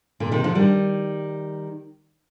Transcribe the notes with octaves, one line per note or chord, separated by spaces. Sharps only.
A#2 D3
C3 D#3
D3 F3
D#3 G3